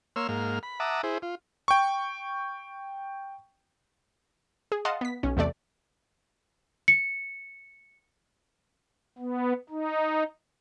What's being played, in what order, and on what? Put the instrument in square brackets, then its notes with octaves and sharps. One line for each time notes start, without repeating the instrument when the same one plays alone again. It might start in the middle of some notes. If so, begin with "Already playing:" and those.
[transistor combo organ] A#3 C#5 C6 E6 F6
G#2 A#3 F6
B5
E5 F#5 A5 A#5 D6 D#6
E4 G#4 C5
F4
[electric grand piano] G5 C#6
[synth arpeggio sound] G#4
D#5 F5 F#5 A5 C6 D#6
B3 B6
B1 C#4
E2 C3 A3 D5
[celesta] C#7
[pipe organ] B3
D#4